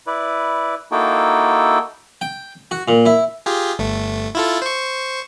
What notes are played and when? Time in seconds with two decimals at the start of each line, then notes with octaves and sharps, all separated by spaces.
0.07 E4 B4 D5
0.92 A#3 D#4 E4 F#4 A4 G5
2.21 G5
2.71 F#4
2.88 A#2
3.05 E4
3.46 F4 G4 G#4
3.79 G1 A3
4.35 E4 F4 A4
4.62 C5 C#6